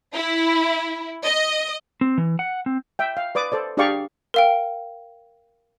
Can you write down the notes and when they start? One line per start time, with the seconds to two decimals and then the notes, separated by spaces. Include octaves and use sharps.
0.13 E4
1.25 D#5
2.01 C4
2.18 E3
2.39 F#5
2.66 C4
2.99 E5 G5
3.17 F5
3.35 B4 D5 D6 D#6
3.52 A4 C5 D5
3.77 D4 G4 G#4 D5 F5 C#6
4.34 A#4 F5 G5